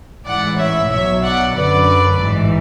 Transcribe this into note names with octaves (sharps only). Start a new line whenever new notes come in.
A1 G#2 E3 D5 F#5
C#5 E5
B1 B2 F#3 C#5 E5
D5 F#5
F#2 D3 F#3 B4 D5
A1 G#2 E3